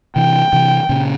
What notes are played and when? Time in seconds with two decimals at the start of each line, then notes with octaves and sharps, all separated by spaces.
0.16 C3 E3 G5
0.53 C3 E3
0.89 A#2 C#3